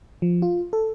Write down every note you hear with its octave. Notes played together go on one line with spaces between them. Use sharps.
F3
F4
A4